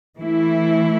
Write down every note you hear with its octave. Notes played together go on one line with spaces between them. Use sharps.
E3 A3 E4